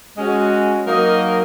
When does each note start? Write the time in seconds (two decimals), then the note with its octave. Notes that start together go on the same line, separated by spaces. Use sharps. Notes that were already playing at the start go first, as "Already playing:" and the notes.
0.18 G#3 C#4 F#4
0.86 F#3 A#3 D#4 A#4 D#5